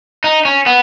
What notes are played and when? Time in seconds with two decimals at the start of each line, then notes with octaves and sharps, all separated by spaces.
0.24 D#4
0.45 C#4
0.66 B3